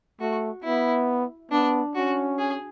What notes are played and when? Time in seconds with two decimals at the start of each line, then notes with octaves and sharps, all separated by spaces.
0.20 A3 F#4
0.64 B3 E4
1.51 B3 D4
1.95 C#4 F#4
2.39 G#4